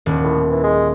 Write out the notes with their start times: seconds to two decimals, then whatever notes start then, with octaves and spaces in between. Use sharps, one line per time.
0.06 D#1
0.24 A2
0.50 E3
0.64 G#3